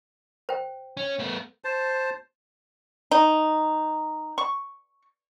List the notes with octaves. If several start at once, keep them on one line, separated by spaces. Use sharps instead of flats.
C5 G5
C#4
A3 B3
C5 A5
D#4
C#6